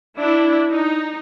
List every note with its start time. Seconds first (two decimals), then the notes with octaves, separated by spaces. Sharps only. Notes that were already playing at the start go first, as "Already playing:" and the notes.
0.17 D4 E4
0.73 D#4